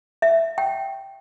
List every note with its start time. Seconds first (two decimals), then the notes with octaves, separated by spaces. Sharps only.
0.22 E5
0.58 G5